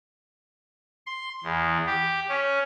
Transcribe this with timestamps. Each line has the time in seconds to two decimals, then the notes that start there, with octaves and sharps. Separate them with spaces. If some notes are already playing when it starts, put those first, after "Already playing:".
1.07 C6
1.44 E2
1.87 G4
2.29 C#4